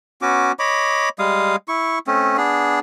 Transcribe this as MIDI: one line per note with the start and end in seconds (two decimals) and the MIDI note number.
0.22 0.52 59
0.22 0.52 61
0.22 0.52 66
0.22 0.52 86
0.59 1.09 73
0.59 1.09 75
0.59 1.09 83
0.59 1.09 86
1.19 1.56 55
1.19 1.56 56
1.19 1.56 77
1.19 1.56 87
1.68 1.99 64
1.68 1.99 85
2.07 2.37 57
2.07 2.37 60
2.07 2.37 61
2.37 2.80 59
2.37 2.80 62
2.37 2.80 68